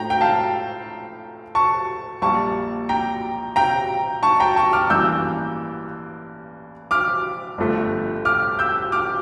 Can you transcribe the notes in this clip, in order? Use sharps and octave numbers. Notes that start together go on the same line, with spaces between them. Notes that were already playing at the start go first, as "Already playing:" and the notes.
Already playing: A2 F3 A3 G5 A#5
G5
F5 A5
A5 C#6
A#1 A#2 G3 A#3 A5 C#6
G5 A#5
G5 A#5
A5 C#6
G5 A#5
A5 C#6
D6 F6
A1 G2 E3 A#3 E6 G6
D6 F6
G1 G2 F3 A3
D6 F6
E6 G6
D6 F6